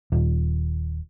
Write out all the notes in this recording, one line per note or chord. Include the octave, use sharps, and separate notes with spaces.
D#1